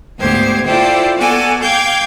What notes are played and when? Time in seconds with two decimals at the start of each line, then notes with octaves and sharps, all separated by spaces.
0.19 D2 G#2 B3 G4 C5 G#6
0.64 E4 F4 A4 C5 D5 G5
1.17 B3 F#4 A4 D5 F#5 G#5
1.61 F5 G5 D6 G6 G#6